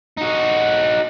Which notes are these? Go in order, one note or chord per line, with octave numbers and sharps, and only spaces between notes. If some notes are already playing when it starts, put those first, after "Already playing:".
D#4 F#4